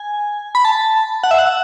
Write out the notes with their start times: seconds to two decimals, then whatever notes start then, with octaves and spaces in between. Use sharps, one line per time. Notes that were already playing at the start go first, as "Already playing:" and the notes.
Already playing: G#5
0.55 B5
0.65 A5
1.24 F#5
1.31 E5
1.38 F#5